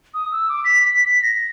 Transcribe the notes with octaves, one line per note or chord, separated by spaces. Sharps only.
D#6
E6
D6
B6
B6
B6
A#6